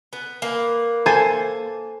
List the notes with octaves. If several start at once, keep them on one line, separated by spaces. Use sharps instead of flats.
B3
A#3 B4
A4 C5 G#5